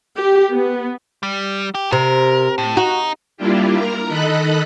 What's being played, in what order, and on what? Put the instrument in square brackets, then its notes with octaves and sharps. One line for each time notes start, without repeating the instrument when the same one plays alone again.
[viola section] G4
B3
[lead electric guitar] G3
G4
[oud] C3 [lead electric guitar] A#4
[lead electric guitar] A2
[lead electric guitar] D#4 [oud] F#4
[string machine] G3 A#3 D4 E4 F4 G4
A#4 A#5
D#3 A4 D#5 B5 F#6